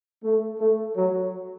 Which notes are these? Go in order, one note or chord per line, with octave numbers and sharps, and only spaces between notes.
A3
A3
F#3